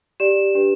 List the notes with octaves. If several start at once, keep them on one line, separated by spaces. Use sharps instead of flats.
G4 D5 E7
D4 G4 B4